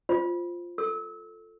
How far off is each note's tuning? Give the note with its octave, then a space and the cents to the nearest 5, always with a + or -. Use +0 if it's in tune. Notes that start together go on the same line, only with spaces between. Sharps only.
F4 +0 C5 +0
A4 +5 E6 -30